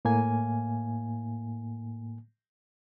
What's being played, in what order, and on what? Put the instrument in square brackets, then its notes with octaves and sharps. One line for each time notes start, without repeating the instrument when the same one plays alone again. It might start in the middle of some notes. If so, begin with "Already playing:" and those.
[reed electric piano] A2 A#3 G#5